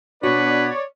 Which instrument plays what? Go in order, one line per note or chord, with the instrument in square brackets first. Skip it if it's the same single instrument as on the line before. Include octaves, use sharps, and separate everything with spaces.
[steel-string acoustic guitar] B2 F#4 [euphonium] D4 [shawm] B4 [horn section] C#5 D5